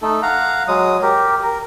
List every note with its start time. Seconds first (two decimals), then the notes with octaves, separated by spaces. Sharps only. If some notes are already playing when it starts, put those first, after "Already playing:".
0.02 A3 D#4 A4
0.22 F5 F#5 A#5
0.68 F#3 G#3 D#6
1.02 G4 A#4
1.43 A#4